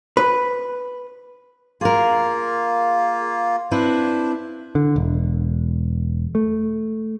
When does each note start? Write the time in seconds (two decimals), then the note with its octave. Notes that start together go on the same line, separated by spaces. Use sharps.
0.17 B4
1.81 A#3 F4 G#4 A#4
3.71 C4 D4 E4 B4 C5
4.75 D3
4.96 E1
6.35 A3